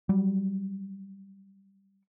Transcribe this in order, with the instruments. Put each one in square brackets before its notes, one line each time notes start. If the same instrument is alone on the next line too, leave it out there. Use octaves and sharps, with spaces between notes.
[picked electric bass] F#3 G3